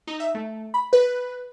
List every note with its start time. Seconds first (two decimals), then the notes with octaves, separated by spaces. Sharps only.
0.07 D#4
0.20 E5
0.35 A3
0.74 B5
0.93 B4